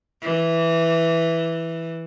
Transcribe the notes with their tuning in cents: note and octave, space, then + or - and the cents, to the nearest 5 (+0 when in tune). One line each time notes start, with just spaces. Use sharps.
E3 +0